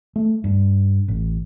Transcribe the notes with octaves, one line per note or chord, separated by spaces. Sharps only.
A3
G2
A1